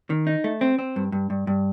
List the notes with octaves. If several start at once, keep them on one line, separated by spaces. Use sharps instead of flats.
D#3
D#4
A3
C4
C4
G2
G2
G2
G2